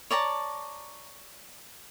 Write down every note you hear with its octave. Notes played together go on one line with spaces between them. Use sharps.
C#5 D5 A5 A#5